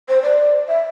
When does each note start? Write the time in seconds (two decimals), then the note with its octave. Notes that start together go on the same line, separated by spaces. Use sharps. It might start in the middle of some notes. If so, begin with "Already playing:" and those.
0.09 C5
0.23 D5
0.68 E5